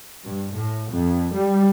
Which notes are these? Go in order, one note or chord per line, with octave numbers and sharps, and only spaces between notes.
G2
A2
F2
G3